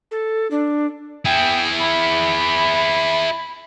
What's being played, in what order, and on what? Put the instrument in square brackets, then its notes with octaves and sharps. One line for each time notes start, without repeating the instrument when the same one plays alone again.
[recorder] A4
D4
[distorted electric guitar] E4 G#4 [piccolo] G5
[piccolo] B5